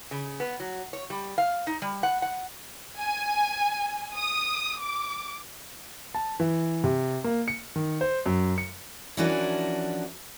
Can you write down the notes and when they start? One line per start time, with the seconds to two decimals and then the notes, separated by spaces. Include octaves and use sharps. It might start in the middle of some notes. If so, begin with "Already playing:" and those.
0.11 C#3
0.40 B3
0.60 F#3
0.93 C#5
1.10 G3
1.38 F5
1.67 D#4
1.82 G3
2.03 F#5
2.22 F#5
2.99 G#5
4.18 D#6
4.82 D6
6.15 A5
6.40 E3
6.84 C3
7.24 A#3
7.48 C#7
7.76 D#3
8.01 C5
8.26 F#2
8.58 C#7
9.17 E3 F3 C#4 D4 F#4 A#4